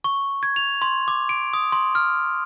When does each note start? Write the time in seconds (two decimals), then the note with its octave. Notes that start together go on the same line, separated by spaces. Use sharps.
0.04 C#6
0.43 G#6
0.56 F7
0.82 C6
1.08 D6
1.29 D7
1.53 D#6
1.72 C6
1.95 F6